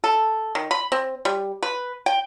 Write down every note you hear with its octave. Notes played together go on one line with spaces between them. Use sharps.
A4
D#3
B5
C4
G3
B4
G5